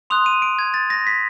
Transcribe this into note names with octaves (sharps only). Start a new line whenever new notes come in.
C6 D#6 F#6 F7
D#7
D7
G#6
A6
A#6
B6